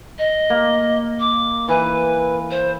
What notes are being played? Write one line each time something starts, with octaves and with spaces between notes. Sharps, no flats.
D#5
A#3
D6
E3 B4
C5